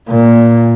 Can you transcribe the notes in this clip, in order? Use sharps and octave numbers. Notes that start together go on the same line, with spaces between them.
A#2